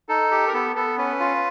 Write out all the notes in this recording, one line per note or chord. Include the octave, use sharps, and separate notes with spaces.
D#4 A4
G4
A#4
B3 A4
B3 A4
C#4 B4
F4